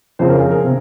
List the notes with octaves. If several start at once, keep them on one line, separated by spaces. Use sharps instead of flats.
F2 C#3 C5
A#4
G#4
A#4
C3